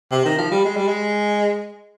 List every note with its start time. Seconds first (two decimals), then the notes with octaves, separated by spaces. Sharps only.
0.11 C3
0.25 D#3
0.38 F3
0.52 G3
0.65 G#3
0.77 G3
0.88 G#3